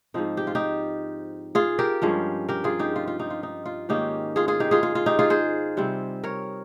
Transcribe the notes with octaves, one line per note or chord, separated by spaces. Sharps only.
G#2 F3 C4 D#4
G4
F4
D#4 G4
F4 G#4
G4 A#4
G2 F3 G#3 C#4
G4 A#4
F4 G#4
D#4 G4
F4
F4
D#4 G4
F4
D#4
F4
G#2 D#3 A#3 C#4 D#4 G4
F4 G#4
F4 G#4
D#4 G4
F4 G#4
F4
F4
D#4 G4
F4 G#4
G#4 C5
C3 G3 C4
A#4 C#5